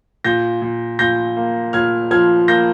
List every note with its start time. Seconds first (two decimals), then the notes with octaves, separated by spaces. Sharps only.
0.24 A#2 G6 A#6
0.62 A#2
0.99 A#2 G6 A#6
1.36 A#3
1.73 A#2 F6 G#6
2.11 F3 F6 G#6
2.48 A#3 G6 A#6